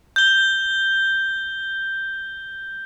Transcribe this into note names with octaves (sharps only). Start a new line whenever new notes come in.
G6 G7